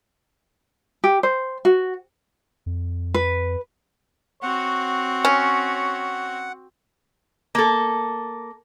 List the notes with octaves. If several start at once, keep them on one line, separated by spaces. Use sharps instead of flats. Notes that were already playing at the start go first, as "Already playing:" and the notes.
G4
C5
F#4
F2
B4
C4 F#4 C#5 F#5
C#4
A#3 A4